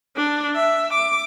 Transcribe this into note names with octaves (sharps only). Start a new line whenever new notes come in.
D4
E5
D6